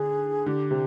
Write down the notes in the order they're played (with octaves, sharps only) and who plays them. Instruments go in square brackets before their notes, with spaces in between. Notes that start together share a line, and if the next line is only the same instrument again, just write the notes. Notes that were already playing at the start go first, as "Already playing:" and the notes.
Already playing: [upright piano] D3 [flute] G#4
[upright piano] D3 [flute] G4
[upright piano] C3